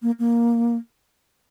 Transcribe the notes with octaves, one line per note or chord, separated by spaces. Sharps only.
A#3
A#3